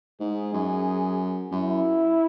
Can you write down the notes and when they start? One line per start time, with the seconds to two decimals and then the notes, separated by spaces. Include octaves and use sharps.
0.20 G#2 G#4
0.54 F#2
1.51 F#2 E4